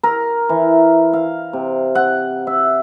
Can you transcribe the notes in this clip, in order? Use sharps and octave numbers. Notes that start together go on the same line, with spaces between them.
A#4
E3
F5
C3
F#5
E5